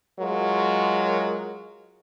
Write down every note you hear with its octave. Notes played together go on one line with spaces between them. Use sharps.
F#3 G#3 F4 A#4